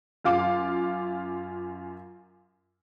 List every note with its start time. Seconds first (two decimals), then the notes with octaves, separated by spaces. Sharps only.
0.24 F#2 F4 F5 D6